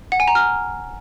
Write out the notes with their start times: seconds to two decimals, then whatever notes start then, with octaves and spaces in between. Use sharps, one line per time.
0.12 F#5
0.20 G#5
0.28 A#5
0.35 F6